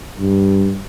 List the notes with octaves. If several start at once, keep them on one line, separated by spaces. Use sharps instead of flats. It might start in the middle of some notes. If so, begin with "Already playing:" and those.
G2